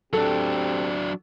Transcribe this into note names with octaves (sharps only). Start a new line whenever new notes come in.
F#3 C4 D4 G4 A4